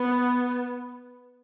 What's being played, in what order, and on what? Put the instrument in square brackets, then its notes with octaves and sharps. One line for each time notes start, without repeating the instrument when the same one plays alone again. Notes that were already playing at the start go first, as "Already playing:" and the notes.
Already playing: [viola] B3